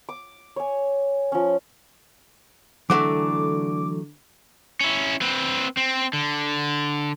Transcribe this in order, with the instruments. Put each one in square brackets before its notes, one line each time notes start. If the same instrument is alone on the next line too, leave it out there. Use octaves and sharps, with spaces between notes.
[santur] D6
C#5 G#5
F3 C#4
[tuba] D3 [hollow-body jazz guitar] E3 F#3 A3 [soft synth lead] D6
[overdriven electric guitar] C#4 E4
C4 B4
C4
D3